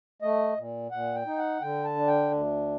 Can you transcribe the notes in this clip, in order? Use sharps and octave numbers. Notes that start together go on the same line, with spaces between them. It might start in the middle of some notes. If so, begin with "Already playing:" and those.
A3 D#5
A#2
A#2 F#5
G5
D#4
F#5
D3 G5
A5
D4
G5
D2